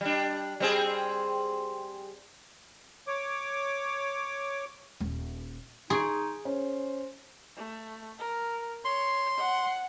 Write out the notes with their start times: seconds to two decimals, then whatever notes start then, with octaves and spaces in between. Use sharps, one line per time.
0.01 G3 D4
0.60 G3 C4 G#4
3.07 C#5 D6
5.00 D#1
5.90 D#4 G#4 C6 C#6 D7
6.45 C#4 C5
7.57 A3
8.19 A#4
8.85 C#5 C6
9.38 F#5